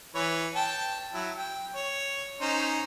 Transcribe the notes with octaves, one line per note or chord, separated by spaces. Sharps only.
E3 B4 C#5
G5 A5
F#3 E4
G5
C#5
C#4 D#4 C5